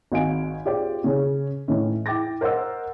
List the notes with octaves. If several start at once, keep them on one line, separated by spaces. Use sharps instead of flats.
G#1 F#4 D#5 F5 G#5 D7
F4 G4 G#4 C5 D5 G5
C#3 C#4 G#4
A2 E3 C#4 D#4
E4 G5 D6 A6 A#6
A#4 C5 D#5 F#5 E6